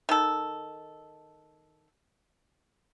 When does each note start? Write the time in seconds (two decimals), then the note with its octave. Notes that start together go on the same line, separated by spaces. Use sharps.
0.09 D#3 A4